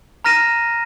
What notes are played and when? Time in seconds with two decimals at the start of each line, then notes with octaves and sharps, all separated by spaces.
0.25 A#5 F6 A#6 D#7 E7